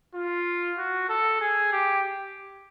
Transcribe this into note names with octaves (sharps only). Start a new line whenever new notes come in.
F4
F#4
A4
G#4
G4